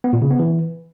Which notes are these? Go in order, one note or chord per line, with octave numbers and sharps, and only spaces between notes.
B3
A#2
C#3
B3
E3